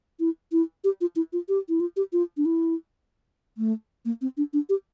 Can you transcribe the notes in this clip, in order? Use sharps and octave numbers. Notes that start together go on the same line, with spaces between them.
E4
E4
G4
F4
E4
F4
G4
E4
F4
G4
F4
D4
E4
A3
A#3
C4
D4
D4
G4